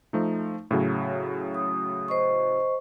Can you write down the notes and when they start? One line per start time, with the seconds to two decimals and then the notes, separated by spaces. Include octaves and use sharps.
0.13 F3 A3 D#4
0.71 A2 C#3 F#3
1.55 D#6
2.08 C5 D#5 C#6